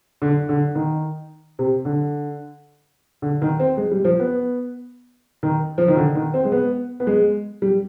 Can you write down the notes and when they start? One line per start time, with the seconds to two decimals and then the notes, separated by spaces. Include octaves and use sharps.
0.22 D3
0.49 D3
0.75 D#3
1.59 C3
1.85 D3
3.22 D3
3.42 D#3
3.60 C4
3.77 G#3
3.91 G3
4.05 F3
4.19 B3
5.43 D#3
5.78 F3
5.88 D#3
5.97 D3
6.15 D#3
6.34 C4
6.45 G#3
6.52 B3
7.00 B3
7.07 G#3
7.62 G3